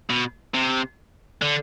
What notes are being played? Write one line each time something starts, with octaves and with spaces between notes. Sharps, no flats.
B2
C3
D3